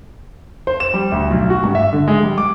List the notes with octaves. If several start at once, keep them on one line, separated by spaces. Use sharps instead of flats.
C5
E7
G3
D2
B1
F#4
G2
E5
D3
G#3
G3
D6